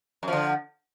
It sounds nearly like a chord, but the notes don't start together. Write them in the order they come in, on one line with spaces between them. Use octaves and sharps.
F#2 F3 D3